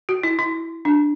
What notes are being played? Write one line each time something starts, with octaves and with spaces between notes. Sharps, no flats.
F#4
E4
E4
D4